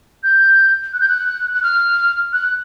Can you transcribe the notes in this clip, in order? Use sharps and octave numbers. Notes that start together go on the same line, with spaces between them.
G6
F#6
G6
F#6
F#6
F6
F#6